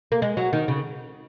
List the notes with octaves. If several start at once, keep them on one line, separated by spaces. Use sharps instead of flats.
A#3
G#3
F#3
D#3
C#3